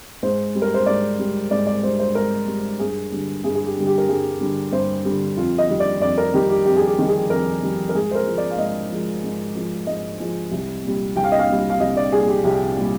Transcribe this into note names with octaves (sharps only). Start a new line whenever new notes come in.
G#2 C5
G3
A#4
C5
G#2 D5
G3
G#2 D5
D5
G3 C5
C5
G#2 A#4
G3
G2 G#4
D3 G3
G2 G#4
G#4
G4
D3 G3
G4
A#4
G2 G#4
D3 G3
G2 C5
D3 G3
F2 F4
D#5
D#3 G3
D5
F2 D5
A#4
D#3 G3 G4
G4
F2 G4
G#4
G4
D#3 G3
G#4
F2 A#4
D#3 G3
A#4
G#2 G#4
C5
A#4
F3 G#3
D5
F5
G#2 D#5
F3 G#3
G#2
F3 G#3
G#2 D#5
F3 G#3
C2
A#2 G3
C2 G5
F5
D#5
F5
A#2 G3
F5
C2 D#5
D5
A#2 G3 G#4
G4
C2 G4
A#2 G3